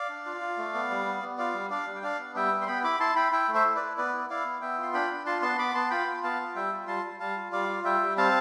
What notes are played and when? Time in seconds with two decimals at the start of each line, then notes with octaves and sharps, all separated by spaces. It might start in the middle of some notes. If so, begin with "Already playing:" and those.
Already playing: D5 F5
0.09 D4
0.26 F4
0.41 F4
0.57 A3
0.74 B3
0.90 G3
1.06 B3
1.22 B3
1.38 F4 D5 F5
1.54 G3
1.70 D4 D5 F5
1.87 G3
1.96 G5
2.03 D4 D5 F5
2.19 B3
2.35 G3 E5 G5
2.52 B3
2.61 C6
2.67 B3 G5 B5
2.84 E4 B5 D6
3.00 E4 A5 C6
3.16 E4 G5 B5
3.32 E4 E5 G5
3.49 A3
3.54 C5 E5
3.65 E4
3.76 E4 B4 D5
3.97 B3 B4 D5
4.13 E4
4.29 E4 D5 F5
4.45 B3
4.61 B3 E5 G5
4.78 F4 C6
4.94 D4 G5 B5
5.10 D4
5.26 F4 A5 C6
5.42 B3 A5 C6
5.58 B3 B5 D6
5.74 B3 A5 C6
5.90 F4 G5 B5
6.07 F4
6.23 B3 F5 A5
6.39 F4
6.55 G3 E5 G5
6.72 F4
6.87 G3 A5 C6
7.03 G3
7.20 G3 F5 A5
7.36 F4
7.52 G3 D5 F5
7.69 F4
7.84 G3 E5 G5
8.01 G3
8.17 C4 F5 A5